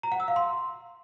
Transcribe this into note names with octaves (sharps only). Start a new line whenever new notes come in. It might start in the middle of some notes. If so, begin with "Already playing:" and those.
A#5
F#5
E6
F5
C6